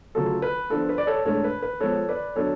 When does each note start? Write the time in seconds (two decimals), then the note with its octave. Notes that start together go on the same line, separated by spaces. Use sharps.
0.15 C#3 F#3 A3 F4 A4
0.42 B4
0.70 F3 B3 D4 F4 A4
0.89 B4
0.98 D5
1.07 A4 C#5
1.25 A2 G#3 D4 A4 C#5
1.44 B4
1.62 B4
1.80 F3 G#3 B3 A4 C#5
2.09 B4 D5
2.36 F#3 B3 D4 A4 C#5